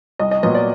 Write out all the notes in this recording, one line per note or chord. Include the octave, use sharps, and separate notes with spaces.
C2 D#5
D#5
A#2 F#3 B3 D#5
D5